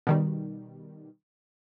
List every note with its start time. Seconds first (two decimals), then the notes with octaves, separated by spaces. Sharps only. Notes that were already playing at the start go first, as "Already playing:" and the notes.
0.07 B2 D#3 G3